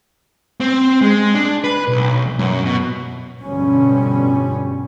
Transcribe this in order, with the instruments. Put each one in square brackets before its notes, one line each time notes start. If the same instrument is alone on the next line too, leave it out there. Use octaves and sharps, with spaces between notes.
[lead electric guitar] C4
G#3
D4
B4
B1
F#2
B2
[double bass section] G2 B2 D3 F3 G3 C#4